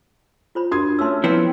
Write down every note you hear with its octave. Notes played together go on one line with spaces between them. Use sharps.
F4 C5 B5
D4 F#4 A#4 C6 D#6 G#6
A3 C#4 C6 E6
F3 B3 C4 E4